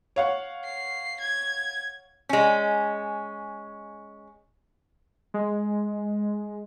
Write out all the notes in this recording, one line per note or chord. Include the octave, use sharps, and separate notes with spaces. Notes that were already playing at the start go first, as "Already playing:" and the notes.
C#5 F5 F#5
C7
G#6
G#3 C#4
G#3